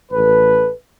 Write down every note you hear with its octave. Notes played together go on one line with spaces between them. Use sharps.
A1 A4 B4